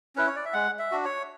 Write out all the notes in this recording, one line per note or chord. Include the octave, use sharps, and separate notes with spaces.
C#4 E4 B4
C#5
D5
E5
G#3 F#5
E5
D4 F#4
C#5